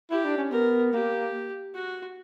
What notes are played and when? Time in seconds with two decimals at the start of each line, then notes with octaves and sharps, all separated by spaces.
0.11 E4 G4
0.25 D4
0.38 C#4
0.51 B3 A#4
0.93 A#3 G4
1.75 F#4